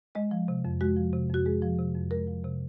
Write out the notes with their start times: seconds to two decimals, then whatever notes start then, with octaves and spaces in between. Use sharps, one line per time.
0.15 G#3 D#5
0.31 F3
0.48 C3
0.65 F2
0.81 G#3 F#4
0.97 F3
1.13 C3
1.29 F2 F#4
1.46 G#3 G#4
1.62 F3
1.79 C3
1.94 F2
2.11 G#3 A#4
2.27 F3
2.44 C3